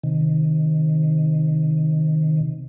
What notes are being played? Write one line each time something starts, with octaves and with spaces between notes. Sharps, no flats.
C3 D#3